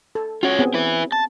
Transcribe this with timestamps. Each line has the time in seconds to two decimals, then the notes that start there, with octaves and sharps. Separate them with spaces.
0.15 A4
0.43 C#4 F4 F#4 C#5
0.59 B3 C4 G#4
0.74 E4 B4
1.12 A5